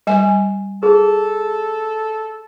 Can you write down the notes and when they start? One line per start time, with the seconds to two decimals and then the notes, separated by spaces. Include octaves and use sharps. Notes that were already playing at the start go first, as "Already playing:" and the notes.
0.07 G3 G#5
0.83 G#4 A4